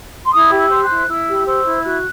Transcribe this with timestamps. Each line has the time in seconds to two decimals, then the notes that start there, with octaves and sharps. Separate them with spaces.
0.24 C6
0.33 E4 D#6
0.51 G4
0.57 E6
0.70 C5
0.83 F#6
0.90 E4
1.08 E4 E6
1.28 G4
1.46 C5 E6
1.65 E4
1.84 F#4 F#6